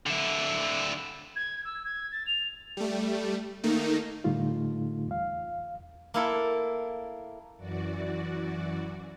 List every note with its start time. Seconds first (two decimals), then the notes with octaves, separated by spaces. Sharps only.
0.06 D3 E4
1.35 G#6
1.64 E6
1.84 G#6
2.11 A6
2.26 F7
2.77 G3 A3
3.64 D#3 A3 A#3 D#4
4.24 A2 D3 G3 A3 D#4 F4
5.07 E2 F5
6.14 A#3 E4 A4
7.57 F#2 E3 F#4 D5